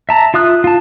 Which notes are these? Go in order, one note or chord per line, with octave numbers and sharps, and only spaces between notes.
E5 A5 A#5
F4 E5 D#6 F#6
F4 A5